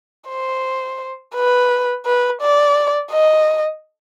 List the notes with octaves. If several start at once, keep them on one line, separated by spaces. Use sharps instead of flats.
C5
B4
B4
D5
D#5